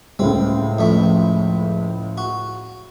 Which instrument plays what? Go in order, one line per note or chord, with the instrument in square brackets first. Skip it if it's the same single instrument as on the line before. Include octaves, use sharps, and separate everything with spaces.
[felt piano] C#2 A2 G#3 [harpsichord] C4
[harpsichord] F2 A3
F#4